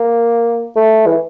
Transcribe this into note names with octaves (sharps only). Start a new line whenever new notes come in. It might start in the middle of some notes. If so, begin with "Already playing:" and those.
Already playing: A#3
A3
E3